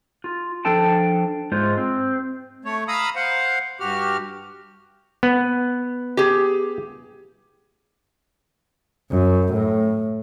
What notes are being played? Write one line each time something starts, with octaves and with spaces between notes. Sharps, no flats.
F4
F3 D4 A4 G5 A5
G#2 G#3 F4 C5
C4
A3 C#5
F5 A#5 B5 D#6 E6
C5 F5 F#5
G2 F#4 G4 F6
B3
G4 G#4
F#2
A2